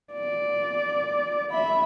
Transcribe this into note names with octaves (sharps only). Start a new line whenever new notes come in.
D5
E5 B5